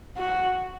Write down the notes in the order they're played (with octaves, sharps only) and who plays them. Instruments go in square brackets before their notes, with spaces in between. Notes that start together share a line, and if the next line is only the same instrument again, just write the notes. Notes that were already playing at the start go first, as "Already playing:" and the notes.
[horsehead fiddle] F#4